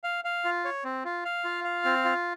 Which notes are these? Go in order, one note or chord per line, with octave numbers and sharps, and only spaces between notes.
F5
F5
F4
C#5
C4
F4
F5
F4
F5
C4
F4